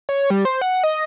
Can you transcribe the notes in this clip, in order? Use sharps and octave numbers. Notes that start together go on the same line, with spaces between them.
C#5
G3
C5
F#5
D#5